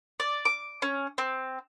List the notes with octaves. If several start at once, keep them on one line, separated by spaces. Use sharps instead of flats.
D5
D6
C#4
C4